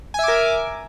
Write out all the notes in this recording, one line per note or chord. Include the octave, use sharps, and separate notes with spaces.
A#4 E5 G#5 D6